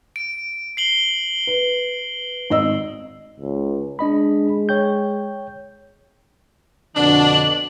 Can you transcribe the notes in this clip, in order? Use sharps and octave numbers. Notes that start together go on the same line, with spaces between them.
D7
C7 F#7 G7
B4
G#1 D#5 E6
C#2
G#3 D4 D#5 B5
C#5 G5 G6
F2 B2 D3 D4 F#7